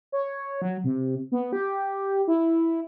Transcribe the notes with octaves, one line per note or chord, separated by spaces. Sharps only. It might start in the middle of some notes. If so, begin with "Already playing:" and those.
C#5
F#3
C3
B3
G4
E4